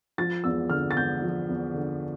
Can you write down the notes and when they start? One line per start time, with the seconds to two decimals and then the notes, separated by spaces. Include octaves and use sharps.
0.18 F3 A6
0.44 E2 E6
0.70 D3 F6
0.91 A6
0.96 E2 G6
1.22 F3
1.49 E2
1.74 D3